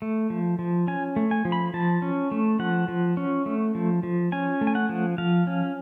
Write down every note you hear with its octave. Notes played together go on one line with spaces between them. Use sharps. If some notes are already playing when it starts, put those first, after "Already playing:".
A3
F3
F3
C#4 G#5
A3
G#5
F3
B5
F3 A5
C#4
A3
F3 F#5
F3
C#4
A3
F3
F3
C#4 G#5
A3
G#5
F#5
F3
F3 F5
C#4